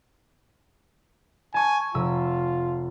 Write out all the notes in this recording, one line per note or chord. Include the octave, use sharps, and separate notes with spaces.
G#5 A5 C#6
F1 F4 E6